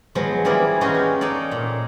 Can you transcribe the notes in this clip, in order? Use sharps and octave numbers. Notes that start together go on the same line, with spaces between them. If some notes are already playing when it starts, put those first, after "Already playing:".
F3 F#3 G#3 B3
E3 G3 A#3 F4 G#4 D5
G#3 C#4 D#4 F4 F#4
G4
D#4 A4 C#5 D5
A#2